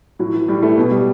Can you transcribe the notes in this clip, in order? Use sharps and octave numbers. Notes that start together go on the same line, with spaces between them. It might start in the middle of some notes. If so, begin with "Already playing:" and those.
A2 F#3
E3
A2 G3
E3 A3
B2 B3
G3